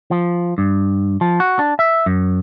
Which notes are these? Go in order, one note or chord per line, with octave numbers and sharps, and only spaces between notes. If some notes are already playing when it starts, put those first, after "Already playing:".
F3
G2
F3
F#4
D4
E5
F#2